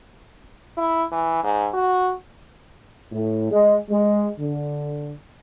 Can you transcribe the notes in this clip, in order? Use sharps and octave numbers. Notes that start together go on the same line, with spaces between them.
E4
E3
G#2
F#4
A2
G#3
G#3
D3